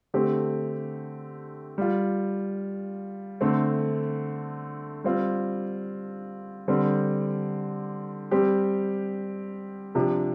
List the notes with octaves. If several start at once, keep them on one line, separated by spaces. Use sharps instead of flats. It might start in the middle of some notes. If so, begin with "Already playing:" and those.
D3 A3 C4 G4
G3 F4
D3 A3 C4
G3 C4 F4
D3 G3 C4
G3 C4 G4
C3 F3 D4 G4